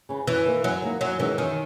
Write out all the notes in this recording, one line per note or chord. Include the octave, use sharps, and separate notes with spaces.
C#3 E3
F#2 E3
D#3 A#3 D#4
F#2 F#3
D#3 A#3 D#4
F#2 F#3
D#3 E3 G#3 C#4
F#2 D#3